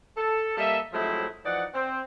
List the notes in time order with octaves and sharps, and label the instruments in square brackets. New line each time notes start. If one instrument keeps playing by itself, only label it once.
[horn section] A4
G3 A#3 A4 D#5 E5
F3 F#3 G#3 A3 C4 E4
E3 F3 D#4 D5 F#5
C4